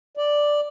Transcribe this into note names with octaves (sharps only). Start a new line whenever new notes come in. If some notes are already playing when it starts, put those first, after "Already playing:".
D5